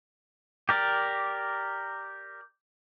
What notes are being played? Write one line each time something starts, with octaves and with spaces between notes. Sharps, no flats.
G4 A#4 D5